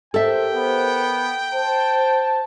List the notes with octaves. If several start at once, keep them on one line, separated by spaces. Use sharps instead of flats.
G4 A4 A#4 C5 E5 G5
B3
C5 A5